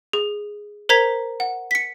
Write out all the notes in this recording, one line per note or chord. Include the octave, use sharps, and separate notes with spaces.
G#4
A#4 C5 A#5 G#6 B6
F#5
B6 C#7